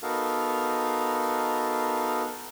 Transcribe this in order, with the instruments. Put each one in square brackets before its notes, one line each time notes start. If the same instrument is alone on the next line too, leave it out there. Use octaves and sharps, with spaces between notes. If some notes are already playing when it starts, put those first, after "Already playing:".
[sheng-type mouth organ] B3 D#4 F#4 A4 A#4 F5